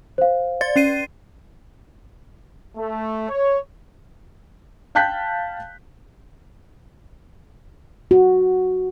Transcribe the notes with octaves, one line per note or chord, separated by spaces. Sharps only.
C5 F5
D5 A6
C#4 C7 D#7
A3
C#5
F5 G5 A5 F#6 G6 B6
F#4